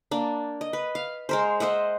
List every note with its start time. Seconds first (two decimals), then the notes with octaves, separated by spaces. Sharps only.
0.11 A#3 D4
0.61 D#5
0.73 B4
0.95 F5
1.29 G#3 A#4 C5
1.60 C5 D#5 E5 F#5